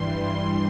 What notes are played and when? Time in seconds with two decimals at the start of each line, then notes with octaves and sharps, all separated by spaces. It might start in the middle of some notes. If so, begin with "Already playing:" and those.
Already playing: G2 E3 G3 C6
0.12 C6